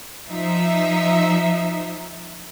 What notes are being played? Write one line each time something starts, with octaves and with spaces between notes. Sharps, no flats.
F3 D#4 E5